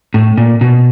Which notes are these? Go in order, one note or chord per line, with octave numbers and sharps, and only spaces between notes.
A2
A#2
B2